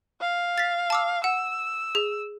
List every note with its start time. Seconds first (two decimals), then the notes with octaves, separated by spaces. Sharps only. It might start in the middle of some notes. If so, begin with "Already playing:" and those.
0.21 F5
0.58 A6 B6
0.90 A5 D6 E6
1.24 F#5 E6
1.95 G#4